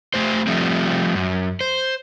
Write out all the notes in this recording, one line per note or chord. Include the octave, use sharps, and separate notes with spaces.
A3 G4 C5
F3 G3 A3 C4
F#2
C5